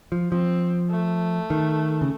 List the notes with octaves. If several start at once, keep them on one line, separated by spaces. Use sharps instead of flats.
F3
F3 C4
A3
D#3
C#3